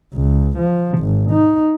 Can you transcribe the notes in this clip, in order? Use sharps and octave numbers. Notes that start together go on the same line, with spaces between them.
C#2
F3
G#1
D#4